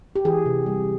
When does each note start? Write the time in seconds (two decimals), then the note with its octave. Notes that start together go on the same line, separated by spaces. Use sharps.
0.16 G4
0.25 E3 G#4
0.46 C3
0.66 G3